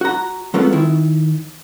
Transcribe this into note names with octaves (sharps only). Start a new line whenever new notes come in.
F#4 A#5
F#3 G#3 A3 B3 C4 F4
D#3 E4